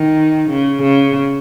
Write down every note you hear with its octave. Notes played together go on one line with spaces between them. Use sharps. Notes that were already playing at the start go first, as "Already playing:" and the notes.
Already playing: D#3
C#3
C#3